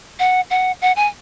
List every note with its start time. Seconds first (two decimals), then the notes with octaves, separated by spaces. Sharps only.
0.19 F#5
0.50 F#5
0.82 F#5
0.96 G#5